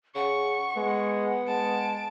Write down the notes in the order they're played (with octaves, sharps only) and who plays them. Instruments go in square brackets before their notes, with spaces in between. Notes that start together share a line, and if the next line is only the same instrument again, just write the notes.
[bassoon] C#3 [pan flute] F#5 [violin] C#6
[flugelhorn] G#3 [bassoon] B3
[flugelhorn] G#3 [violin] A5 D7